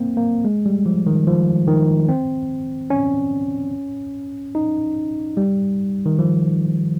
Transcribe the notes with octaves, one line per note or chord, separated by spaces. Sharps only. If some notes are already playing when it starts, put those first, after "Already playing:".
Already playing: A#3 C4
A#3
G#3
G3
F3
D#3
F3
D#3
C4
C#4
D#4
G3
D#3
F3